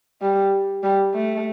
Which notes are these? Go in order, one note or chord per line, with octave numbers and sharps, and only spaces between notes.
G3
G3
A3